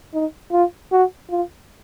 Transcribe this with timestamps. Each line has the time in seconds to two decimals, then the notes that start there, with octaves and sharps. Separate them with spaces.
0.14 D#4
0.52 F4
0.92 F#4
1.30 F4